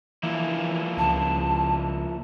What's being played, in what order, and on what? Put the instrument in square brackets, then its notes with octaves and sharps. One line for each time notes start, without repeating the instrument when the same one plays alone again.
[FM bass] E3 [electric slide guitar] F3 A#3 E4
[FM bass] C#2 [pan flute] A5